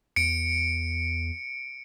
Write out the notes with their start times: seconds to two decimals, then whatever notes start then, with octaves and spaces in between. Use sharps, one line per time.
0.16 E2 C#7 D7